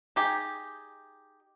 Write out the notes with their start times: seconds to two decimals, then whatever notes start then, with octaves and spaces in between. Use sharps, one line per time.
0.16 D#4 G4 G#4